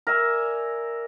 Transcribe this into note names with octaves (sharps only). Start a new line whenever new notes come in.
A#4 D5 E5 G#5